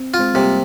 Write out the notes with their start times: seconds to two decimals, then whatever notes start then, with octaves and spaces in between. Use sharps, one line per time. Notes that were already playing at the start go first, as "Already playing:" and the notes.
Already playing: C4
0.14 F4
0.19 G#3 C4
0.34 C3 G3 A#3